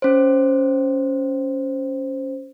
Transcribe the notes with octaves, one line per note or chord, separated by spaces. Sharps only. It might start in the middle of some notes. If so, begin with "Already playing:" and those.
C#4 C5